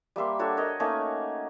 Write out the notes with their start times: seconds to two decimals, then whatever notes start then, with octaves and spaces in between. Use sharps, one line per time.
0.16 G3 A#3 E5 C6
0.39 D4 F#4 A4 C#5
0.57 A#4 C#5 D#5
0.80 A3 A#3 C#4 D#4